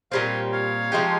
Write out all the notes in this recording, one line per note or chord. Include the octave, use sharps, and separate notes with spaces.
A#2 G3 C4 C#5 F5
C#5 F5
F3 G#3 D#4 G4